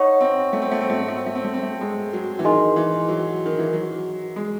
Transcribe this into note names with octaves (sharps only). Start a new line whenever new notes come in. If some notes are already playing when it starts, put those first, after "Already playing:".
Already playing: D#4 C#5 F#5 C#6
C4
A3
C4
A3
C4
A3
C4
A3
C4
A3
C4
A3
C4
A3
G#3
F#3
E3
D#3 D#4 G#4 D#5 G#5 C6
E3
F#3
D#3
E3
F#3
G#3